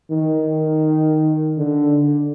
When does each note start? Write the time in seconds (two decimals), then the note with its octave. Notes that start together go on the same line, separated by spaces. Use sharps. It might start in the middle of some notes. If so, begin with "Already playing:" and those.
0.11 D#3
1.57 D3